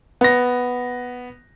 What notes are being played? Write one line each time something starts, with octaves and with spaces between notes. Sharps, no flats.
B3 A#6